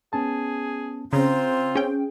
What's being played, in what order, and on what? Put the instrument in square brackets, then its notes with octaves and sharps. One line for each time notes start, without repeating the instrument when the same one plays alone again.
[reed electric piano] B3 C#4 A5 [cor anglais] G#4
[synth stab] C#3 [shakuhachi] C4 [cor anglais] F4 [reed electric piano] A#5
[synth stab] C#4 G5 [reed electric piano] G#4